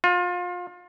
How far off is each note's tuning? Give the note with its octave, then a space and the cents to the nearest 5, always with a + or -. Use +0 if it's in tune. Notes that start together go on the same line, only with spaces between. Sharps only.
F4 +30